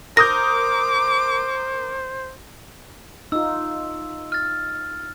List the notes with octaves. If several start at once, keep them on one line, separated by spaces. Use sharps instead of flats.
A#4 C5 D6 D#6 G6 A#6
D#4 F4 E6
F6 A6